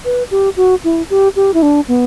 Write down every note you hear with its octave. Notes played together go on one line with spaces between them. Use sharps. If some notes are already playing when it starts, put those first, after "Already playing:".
B4
G4
F#4
E4
G4
G4
E4
D4
B3